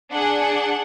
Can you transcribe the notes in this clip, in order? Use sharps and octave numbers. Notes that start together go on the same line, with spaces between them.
D4 G#4 F#5